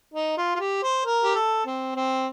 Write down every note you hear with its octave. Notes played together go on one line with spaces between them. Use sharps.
D#4
F4
F4
G4
C5
A#4
G4
A4
C4
C4